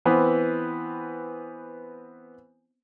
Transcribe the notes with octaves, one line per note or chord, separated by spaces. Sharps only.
E3 B3 C4